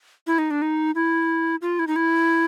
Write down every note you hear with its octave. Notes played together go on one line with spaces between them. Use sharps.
E4
D#4
D4
D#4
E4
F4
E4
D#4
E4